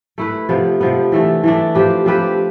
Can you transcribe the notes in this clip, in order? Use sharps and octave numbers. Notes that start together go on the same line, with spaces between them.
A3 E4 B4
C3 F3 B3
C3 F3 B3
E3 A3 D4
E3 A3 D4
F3 C4 G4 B4
F3 C4 G4 B4